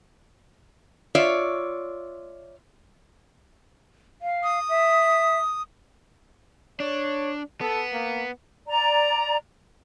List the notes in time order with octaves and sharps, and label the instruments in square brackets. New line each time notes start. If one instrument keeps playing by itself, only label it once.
[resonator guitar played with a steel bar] F4 C#5 D5 E5
[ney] F5
[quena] D#6
[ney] E5
[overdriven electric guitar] D4 [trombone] C#5
[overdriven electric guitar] B3 [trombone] A4
[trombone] A#3
[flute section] D5 A#5